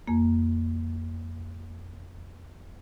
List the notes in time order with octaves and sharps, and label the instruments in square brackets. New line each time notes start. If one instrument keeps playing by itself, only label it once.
[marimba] F2 A#3